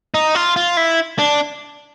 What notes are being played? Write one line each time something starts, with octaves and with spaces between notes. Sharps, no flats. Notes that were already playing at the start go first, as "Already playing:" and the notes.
D#4
F4
F4
E4
D4